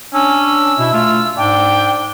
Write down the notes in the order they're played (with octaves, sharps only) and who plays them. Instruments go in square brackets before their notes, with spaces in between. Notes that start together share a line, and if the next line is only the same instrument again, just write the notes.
[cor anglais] C#4 [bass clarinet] D4 [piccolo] E6
[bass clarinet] B2 [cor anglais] E4
[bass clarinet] A3 [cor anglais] F4
[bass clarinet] G#2 [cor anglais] D4 [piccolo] G5